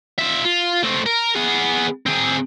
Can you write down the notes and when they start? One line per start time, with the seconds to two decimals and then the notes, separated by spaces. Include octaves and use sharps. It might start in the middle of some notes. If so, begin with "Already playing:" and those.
0.18 F4 E5
0.45 F4
0.83 A3 C4
1.06 A#4
1.35 B3 G#4
2.06 C4 G#4